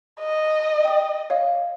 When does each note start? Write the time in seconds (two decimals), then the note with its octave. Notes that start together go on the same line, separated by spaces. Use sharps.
0.20 D#5
0.85 G5 D#6
1.30 C#5 D#5 F5